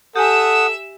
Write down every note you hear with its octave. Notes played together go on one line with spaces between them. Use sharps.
G4 A4 E5 F#5 G#5 D#6 E6